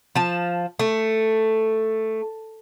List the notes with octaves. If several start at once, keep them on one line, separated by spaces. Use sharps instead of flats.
F3 A5
A3